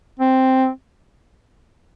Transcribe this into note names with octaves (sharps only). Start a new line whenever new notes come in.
C4